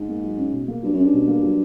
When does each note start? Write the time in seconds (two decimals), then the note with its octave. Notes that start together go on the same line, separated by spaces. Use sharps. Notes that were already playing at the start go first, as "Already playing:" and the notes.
Already playing: G#2
0.08 A#3
0.23 F#3
0.38 C#4
0.53 B2
0.68 A#3
0.83 G2 F#3
0.94 F#2 C#4
1.04 G2
1.13 B2
1.28 A#3
1.43 F#3